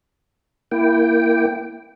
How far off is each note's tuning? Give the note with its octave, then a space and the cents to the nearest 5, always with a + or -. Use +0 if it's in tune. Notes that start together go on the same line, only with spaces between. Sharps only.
A#3 +0 E4 +10 G5 -5